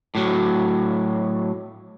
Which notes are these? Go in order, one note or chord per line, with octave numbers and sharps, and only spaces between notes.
A2 F#3